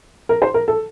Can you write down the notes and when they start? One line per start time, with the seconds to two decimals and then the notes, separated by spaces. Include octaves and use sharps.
0.29 A#4
0.42 C5
0.54 A#4
0.68 A4